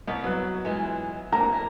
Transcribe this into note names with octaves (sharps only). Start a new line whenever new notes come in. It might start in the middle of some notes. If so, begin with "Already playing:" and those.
C2 B4 D#5
F#3 B3 F#6
E3 G#3 F4
F2 A#3 D4 A#5
E4